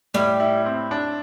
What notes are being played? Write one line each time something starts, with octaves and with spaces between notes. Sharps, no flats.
A2 G3
E4
C4
D4